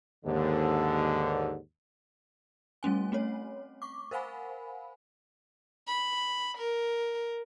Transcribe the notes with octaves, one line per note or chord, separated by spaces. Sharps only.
D#2 G#2 D3
G3 A3 C#4 G#5
A3 C4 C#4 C#5
C#6 D6
A#4 C5 F5 F#5 G#5 B5
B5
A#4